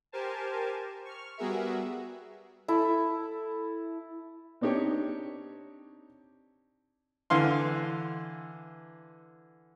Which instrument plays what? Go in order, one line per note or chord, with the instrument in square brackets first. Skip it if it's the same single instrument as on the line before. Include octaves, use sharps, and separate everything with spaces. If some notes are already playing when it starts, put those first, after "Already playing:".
[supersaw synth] G4 A#4 C5 G#5 A5
C#6 F6
G3 B3 F#4 G#4 A#4 E5
[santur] E4 A4
[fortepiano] C4 D4 D#4 G4 C#5
D3 E3 F5 C6